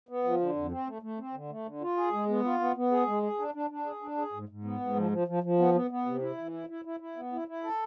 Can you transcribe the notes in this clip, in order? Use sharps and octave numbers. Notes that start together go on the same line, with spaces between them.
B3
F3
D3
F2
C4
A3
A3
C4
D3
A3
D3
F4
G#4
G#3
B3
F4
B3
B3
G#4
G#3
G#4
D4
D4
D4
G#4
D4
G#4
G#2
G#2
B3
G#2
F3
F3
F3
F3
B3
B3
B3
C3
E4
E3
E4
E4
E4
E4
B3
E4
E4
A4